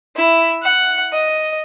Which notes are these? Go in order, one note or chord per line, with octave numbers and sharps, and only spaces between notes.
E4
F#5
D#5